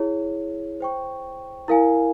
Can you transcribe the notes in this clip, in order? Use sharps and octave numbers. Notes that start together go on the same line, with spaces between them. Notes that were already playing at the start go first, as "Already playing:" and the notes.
Already playing: E4 G#4 C#5
C5 G5 C#6
E4 A#4 F5 G#5